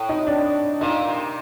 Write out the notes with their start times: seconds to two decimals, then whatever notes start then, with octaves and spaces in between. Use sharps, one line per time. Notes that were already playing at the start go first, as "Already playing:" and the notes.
Already playing: A2
0.09 D#4
0.27 D4
0.81 A#2 D#4
1.08 C3